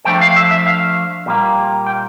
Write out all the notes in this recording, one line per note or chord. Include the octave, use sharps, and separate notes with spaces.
F3 A3 D4 G5
F5
E5
E5
F5
A#2 G3 A#3
G5